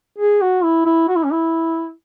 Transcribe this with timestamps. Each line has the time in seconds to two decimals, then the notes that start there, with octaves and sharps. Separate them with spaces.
0.18 G#4
0.41 F#4
0.63 E4
0.86 E4
1.08 F#4
1.16 E4
1.25 C#4
1.32 E4